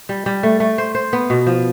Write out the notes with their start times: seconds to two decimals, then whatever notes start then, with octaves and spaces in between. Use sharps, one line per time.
0.09 G3
0.26 G3
0.43 A3
0.60 A3
0.78 C5
0.95 C5
1.13 B3
1.30 B2
1.46 F3